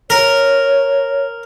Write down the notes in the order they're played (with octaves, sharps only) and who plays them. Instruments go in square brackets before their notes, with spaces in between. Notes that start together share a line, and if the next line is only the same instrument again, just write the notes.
[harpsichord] A#4 [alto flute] C#5